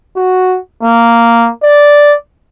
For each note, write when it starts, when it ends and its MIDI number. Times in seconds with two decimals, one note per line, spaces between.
0.16 0.57 66
0.83 1.49 58
1.63 2.15 74